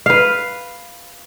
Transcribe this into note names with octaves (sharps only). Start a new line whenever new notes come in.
B4 F5